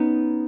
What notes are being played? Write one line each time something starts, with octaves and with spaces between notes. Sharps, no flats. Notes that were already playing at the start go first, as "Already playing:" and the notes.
Already playing: B3 C#4 D#4